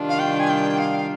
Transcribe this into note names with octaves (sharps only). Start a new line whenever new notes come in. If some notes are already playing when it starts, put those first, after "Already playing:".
Already playing: C3 D#3 G3 D4 F4
F5
G5
G#5
G5
F5